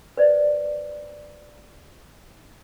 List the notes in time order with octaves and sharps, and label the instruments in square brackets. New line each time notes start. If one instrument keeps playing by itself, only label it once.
[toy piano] B4 C5 D5